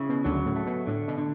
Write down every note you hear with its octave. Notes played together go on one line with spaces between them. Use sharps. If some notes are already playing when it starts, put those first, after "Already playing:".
Already playing: C#3 E4
B2
D2 D3 F#3
A2
A3
B2
A2 D3
B2
D3